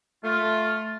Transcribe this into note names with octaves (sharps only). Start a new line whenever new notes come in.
A3 F4